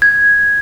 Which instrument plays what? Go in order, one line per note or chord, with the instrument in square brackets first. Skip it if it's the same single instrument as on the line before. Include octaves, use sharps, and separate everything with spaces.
[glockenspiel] G#6